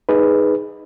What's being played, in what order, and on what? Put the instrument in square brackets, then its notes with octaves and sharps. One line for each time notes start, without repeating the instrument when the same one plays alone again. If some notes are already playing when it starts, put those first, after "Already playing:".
[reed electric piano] D#4 G#4 B4